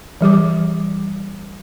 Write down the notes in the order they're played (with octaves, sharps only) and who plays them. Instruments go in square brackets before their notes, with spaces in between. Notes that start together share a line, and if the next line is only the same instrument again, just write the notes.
[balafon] E3 G3 G4 D6